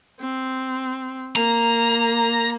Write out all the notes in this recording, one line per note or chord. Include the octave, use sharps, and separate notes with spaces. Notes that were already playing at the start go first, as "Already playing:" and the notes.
C4
A#3 A#5